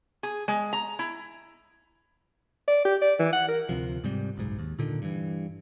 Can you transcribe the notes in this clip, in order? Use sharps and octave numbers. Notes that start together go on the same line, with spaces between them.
G#4
G#3
A#5
E4
D5
G4
D5
E3
F#5
A#4
D2 C3 F3
G#2 C3 G3
F#1 B1 G#2
D#2
A#2 D3 D#3
G2 E3